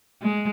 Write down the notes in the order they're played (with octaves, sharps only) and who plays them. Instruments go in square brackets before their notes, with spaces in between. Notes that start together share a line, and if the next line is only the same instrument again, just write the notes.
[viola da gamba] G#3